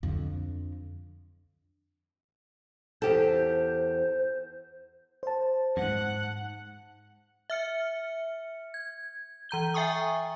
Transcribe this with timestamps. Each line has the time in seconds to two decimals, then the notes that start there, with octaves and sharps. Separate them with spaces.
0.03 F2 D3
3.02 E2 G4 A4 C5
5.23 C5 A5
5.77 F2 G#2 F#5
7.50 E5 F6 C#7
8.74 G#6
9.49 E3 A#5 G6 G7
9.74 E5 G5 G#5 C#6 D#6